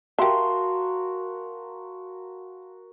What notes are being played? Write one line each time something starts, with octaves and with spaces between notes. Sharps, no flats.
F#4 G4 A#4 E5 F5 A5 C6